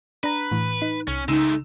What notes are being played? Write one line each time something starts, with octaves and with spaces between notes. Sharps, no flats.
D4 B4 A#5
A2 E3
D#4
C2 C#4
C#3 G#3 A3 D#4 E6 E7